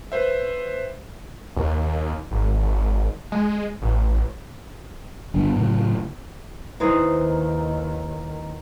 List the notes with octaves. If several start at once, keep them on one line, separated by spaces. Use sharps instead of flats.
B4 C5 E5
D#2
G#1
G#3
A1
G1 G3 B3 D4
F#2 A2 C#3
D#2 D#3 E3 D#4 C5